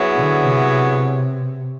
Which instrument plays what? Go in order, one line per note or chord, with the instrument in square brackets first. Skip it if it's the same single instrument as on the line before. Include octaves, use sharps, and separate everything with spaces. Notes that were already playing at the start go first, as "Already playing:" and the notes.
Already playing: [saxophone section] F#3 B3 E4 G#4 C#5
[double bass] D3
C3